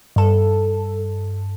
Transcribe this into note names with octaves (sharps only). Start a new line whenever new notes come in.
G2 A4